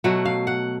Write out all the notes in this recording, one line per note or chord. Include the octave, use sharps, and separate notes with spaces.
B2 F#3 A3 F#5
F5
F#5